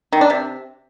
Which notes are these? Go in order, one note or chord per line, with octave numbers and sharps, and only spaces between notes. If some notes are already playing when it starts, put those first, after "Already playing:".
D#3
D4
C3